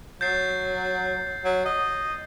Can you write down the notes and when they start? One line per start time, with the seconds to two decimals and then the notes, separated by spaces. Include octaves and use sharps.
0.21 F#3 G6 A6 C7
1.45 F#3
1.65 D#5